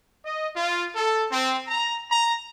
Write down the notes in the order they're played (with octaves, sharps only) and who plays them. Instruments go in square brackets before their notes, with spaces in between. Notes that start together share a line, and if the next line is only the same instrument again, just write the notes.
[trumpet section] D#5
F4
A4
C4
A#5
A#5